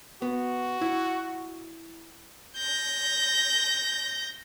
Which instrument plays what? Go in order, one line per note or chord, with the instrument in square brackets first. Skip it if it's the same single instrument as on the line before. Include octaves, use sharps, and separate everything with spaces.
[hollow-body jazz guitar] B3 [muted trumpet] F#4
[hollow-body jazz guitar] E4
[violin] G6 A#6